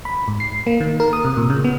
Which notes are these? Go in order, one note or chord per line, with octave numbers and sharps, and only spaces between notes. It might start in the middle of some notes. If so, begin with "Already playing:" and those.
B5
G#2
C7
A#3
D#3
A#4
D#6
C3
A#2
C#3
B3